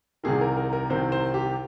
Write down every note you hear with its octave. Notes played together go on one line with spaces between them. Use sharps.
C2 C3 D#3 G#4
A#4
A#4
A#4
C2 C3 D#3 C5
C5
G4